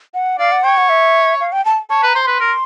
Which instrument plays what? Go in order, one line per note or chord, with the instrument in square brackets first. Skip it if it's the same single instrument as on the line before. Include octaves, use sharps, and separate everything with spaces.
[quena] F#5
[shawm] D5 [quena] F5
[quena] F#5
[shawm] C#5 [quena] G5
[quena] F#5
E5
F5
G5
A5
[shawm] C#5 [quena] A5
[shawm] B4
[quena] A#5
[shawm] C5
[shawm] B4 [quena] C6
[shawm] A#4